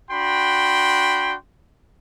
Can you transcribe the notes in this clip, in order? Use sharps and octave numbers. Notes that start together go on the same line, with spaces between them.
D4 F#4 G5 B5 C6